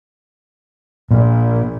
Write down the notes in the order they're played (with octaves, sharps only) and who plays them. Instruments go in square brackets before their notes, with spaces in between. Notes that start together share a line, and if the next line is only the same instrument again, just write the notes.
[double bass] A#1 [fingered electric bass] A#2